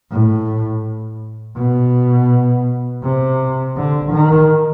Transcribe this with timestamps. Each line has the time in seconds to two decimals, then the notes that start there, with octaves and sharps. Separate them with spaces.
0.11 A2
1.57 B2
3.03 C3
3.76 D3
4.12 D#3